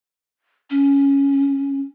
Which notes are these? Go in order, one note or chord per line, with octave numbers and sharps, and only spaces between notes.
C#4